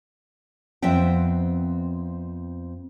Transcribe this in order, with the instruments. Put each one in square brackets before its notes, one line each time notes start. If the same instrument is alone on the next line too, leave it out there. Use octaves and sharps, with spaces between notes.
[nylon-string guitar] F2 B3 C4 E5 G5